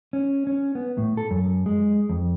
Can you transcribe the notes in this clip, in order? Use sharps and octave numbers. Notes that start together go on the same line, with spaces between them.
C#4
C#4
B3
A2
A4
F#2
G#3
F2